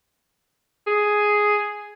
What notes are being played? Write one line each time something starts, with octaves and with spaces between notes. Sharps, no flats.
G#4